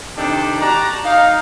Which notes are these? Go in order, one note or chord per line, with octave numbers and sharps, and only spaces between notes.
C3 D#3 D4 D#4 G4 A4
F#4 G4 D5 A5 A#5
D#4 F5